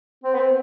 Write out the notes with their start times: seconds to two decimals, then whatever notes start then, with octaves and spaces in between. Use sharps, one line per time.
0.24 C4
0.34 B3
0.40 C4